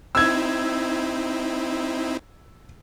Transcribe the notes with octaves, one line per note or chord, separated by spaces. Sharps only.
C4 D#4 E4 E6 G#6